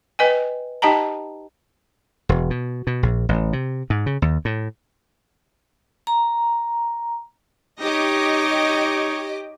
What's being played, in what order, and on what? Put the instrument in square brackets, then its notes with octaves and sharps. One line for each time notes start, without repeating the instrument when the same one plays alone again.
[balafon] B4 D#5 G5 G#5
D#4 G4 D#5 G5 A5 A#5
[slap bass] E1
B2
B2
A#1
A1
C3
G#2
C#3
D#2
A2
[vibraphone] A#5
[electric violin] D#4 C#5 [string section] G4 D#5 D6